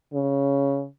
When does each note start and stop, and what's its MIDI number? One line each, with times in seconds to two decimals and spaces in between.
0.13 0.85 49